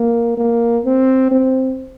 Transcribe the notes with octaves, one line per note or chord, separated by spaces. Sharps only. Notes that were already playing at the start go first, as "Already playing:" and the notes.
Already playing: A#3
A#3
C4
C4